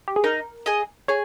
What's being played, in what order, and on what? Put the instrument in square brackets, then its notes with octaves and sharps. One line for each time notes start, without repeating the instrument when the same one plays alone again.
[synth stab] G4
G#4
[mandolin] D#4 [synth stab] A#4
[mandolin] G#4 D#5
[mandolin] G#4 [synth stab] C#5